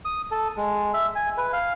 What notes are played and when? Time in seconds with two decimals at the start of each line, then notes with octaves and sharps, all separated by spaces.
0.05 D#6
0.31 A4
0.57 G#3
0.94 E5
1.15 G#5
1.37 B4
1.53 F5